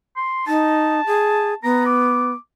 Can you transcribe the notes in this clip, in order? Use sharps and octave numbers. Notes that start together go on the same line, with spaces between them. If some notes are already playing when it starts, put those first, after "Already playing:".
C6
D#4 A5
G#4
B3 A#5
D6